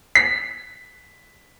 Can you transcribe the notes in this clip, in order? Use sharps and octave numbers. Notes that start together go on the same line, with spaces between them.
B6